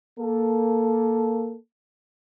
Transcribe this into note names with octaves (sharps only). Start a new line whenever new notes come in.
A#3 A4